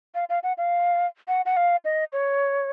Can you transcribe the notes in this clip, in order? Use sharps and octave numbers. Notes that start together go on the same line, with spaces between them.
F5
F5
F#5
F5
F#5
F#5
F5
D#5
C#5